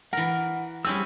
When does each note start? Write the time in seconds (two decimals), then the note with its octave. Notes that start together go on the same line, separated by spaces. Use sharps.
0.13 E3 A#4 F#5
0.85 G3 C4 C#4 E4 G#4 E6